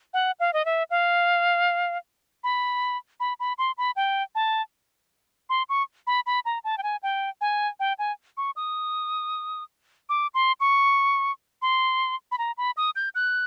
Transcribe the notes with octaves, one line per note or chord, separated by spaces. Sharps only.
F#5
F5
D#5
E5
F5
B5
B5
B5
C6
B5
G5
A5
C6
C#6
B5
B5
A#5
A5
G5
G#5
G5
G#5
G5
G#5
C#6
D#6
D6
C6
C#6
C6
B5
A#5
B5
D#6
G6
F#6